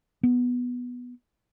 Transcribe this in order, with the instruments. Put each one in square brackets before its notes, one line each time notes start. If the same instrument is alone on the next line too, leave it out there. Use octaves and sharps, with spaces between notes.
[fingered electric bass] B3